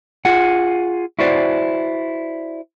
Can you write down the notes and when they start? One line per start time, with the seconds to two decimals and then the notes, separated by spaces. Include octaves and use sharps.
0.25 F4 G#4 F#5
1.19 E4 F#4 B4 C5 D5